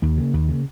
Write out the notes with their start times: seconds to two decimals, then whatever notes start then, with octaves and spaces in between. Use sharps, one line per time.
0.02 D#2 A#3
0.18 C#3
0.33 D#2
0.48 C#3